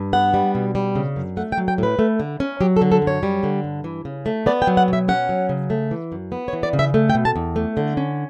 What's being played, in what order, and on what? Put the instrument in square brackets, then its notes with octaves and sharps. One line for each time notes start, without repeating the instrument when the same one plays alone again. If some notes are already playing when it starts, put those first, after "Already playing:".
Already playing: [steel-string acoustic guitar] G2
B3 F#5
G3
B2
G3
C#3
F#2
A3 F#5
G5
F#3
G5
A2 B4
A3
D3
C#4
F#3 G4
A4
D3
A4
F#2
C#5
G3
D3
G2
E3
C#3
A3
B3 D5
G5
F#3
F#5
B2 E5
C#4 F#5
F#3
C#3
A3
E3
F#2
B3
C#5
E3
D5
C#3
E5
A3
G5
B2
A5
E2
A3
D3
C#4